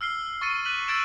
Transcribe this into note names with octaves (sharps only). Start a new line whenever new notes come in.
E6 F6 C7 G7
C#6 A6 C#7 D#7
D6 F#6 B6 D#7 F#7
E6 G#6 A6 D7 E7